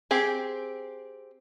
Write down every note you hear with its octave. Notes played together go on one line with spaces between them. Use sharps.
C4 G4 G#4